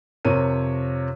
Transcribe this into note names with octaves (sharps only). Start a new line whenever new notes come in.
F2 C3 A#4 C#5 D#7